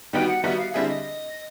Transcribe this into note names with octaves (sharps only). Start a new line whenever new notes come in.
D#3 G3 B3 D#4 F#4 G5
F#5
D#3 G3 B3 D#4 F#4 E5
F5
D3 G3 C4 E4 G#4 E5
D#5